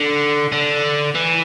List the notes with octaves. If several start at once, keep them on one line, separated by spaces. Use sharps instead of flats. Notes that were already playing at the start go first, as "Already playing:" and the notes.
Already playing: D3
D3
E3